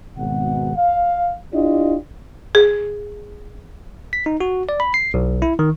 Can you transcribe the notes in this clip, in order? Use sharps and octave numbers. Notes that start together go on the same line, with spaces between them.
G#1 B2 F#5
F5
D4 E4 F4 G4 D5 D#5
G#4
B6
D#4
F#4
D5
B5
C7
B1
E4
D#3